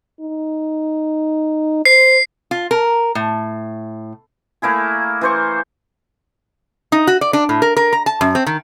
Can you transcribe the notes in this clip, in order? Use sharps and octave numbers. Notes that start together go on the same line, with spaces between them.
D#4
C5 C7
F4
A#4
A2
A3 A#3 E4 G#4
E3 C5 C#6
D#4
F#4
D5
D4
A2
A#4
A#4
A#5
A5
F#2
C4
D#3